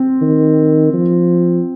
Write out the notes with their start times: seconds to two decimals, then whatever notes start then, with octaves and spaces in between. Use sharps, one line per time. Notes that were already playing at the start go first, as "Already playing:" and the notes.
Already playing: C4
0.21 D#3
0.93 F3